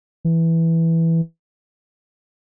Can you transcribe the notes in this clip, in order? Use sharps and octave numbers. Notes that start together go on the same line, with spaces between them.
E3